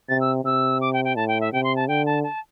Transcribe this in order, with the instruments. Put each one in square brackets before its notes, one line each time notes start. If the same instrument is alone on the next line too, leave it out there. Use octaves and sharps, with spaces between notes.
[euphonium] C3 [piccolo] A6
[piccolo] E6
[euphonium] C3 [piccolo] E6
[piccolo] D6
G5
G5
[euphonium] A2 [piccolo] A5
[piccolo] G5
E5
[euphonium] C3 [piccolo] G5
[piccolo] C6
A5
[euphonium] D3 [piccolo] G5
[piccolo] A5
A5